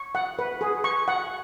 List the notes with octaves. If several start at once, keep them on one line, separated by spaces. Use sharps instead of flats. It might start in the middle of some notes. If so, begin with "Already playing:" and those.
Already playing: C#6
F#5
B4
G#4
C#6
F#5